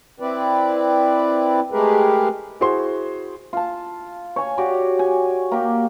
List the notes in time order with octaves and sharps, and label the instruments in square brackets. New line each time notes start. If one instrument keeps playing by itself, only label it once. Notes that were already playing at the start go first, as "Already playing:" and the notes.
[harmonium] C4 E4 B4 D5
G#3 A3 G4 G#4 A#4 B4
[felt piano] E4 F#4 G#4 C5 C6
[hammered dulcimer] F4 A5
C#5 G#5
F#4 G4 C#5 D5
G#5
A#3 G4